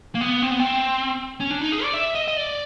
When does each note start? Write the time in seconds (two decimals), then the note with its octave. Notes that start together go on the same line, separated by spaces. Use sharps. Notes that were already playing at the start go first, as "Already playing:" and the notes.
0.15 A#3
0.21 B3
0.42 C4
0.51 B3
0.59 C4
1.40 C#4
1.51 D4
1.61 D#4
1.72 G#4
1.83 D5
1.94 E5
2.15 D#5
2.28 D#5
2.37 D5